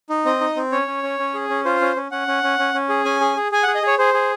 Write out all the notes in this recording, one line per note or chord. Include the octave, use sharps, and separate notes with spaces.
D#4
C4 D#5
D#4
C4
C#4 C#5
C#4
C#4
C#4
G#4
C#4
F4 C5
C#4
C#4
C#4 F#5
C#4
C#4
C#4
C#4
G#4
C#4 G#5
G#4
G#4
G#4 G#5
F#5
G#4
D#5
G#4 C#5
G#4 C5
G#4